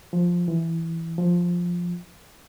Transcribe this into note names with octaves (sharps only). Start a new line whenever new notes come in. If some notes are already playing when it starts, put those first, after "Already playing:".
F3
E3
F3